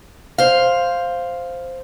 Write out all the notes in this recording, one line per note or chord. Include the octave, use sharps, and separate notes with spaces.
C5 F5